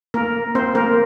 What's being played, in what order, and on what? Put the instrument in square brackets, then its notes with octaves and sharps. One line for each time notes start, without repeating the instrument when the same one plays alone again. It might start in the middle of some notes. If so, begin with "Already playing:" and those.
[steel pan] A#3 A#4
C4 C5
A#3 A#4